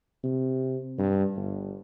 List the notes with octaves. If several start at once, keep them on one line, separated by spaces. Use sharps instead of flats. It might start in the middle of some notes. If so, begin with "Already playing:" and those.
C3
G2
G1